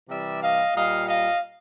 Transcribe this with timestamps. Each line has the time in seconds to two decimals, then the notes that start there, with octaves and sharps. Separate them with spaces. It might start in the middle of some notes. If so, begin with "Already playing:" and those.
0.09 C3 E3 G3 D5 E5
0.42 D#5 F5
0.76 A#2 G3 D#5 F5
1.08 D#5 F5